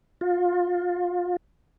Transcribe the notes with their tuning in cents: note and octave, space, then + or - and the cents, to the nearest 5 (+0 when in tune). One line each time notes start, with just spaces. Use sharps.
F4 +25